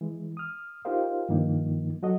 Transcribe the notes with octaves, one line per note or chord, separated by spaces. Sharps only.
E3 G#3
D#6 F6
D#4 F4 G4 A#4 C5 F5
G2 D#3 F3 A#3 D#4
F#3 F#4 A4 D#5